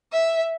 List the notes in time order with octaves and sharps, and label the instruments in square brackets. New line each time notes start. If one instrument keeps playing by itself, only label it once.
[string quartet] E5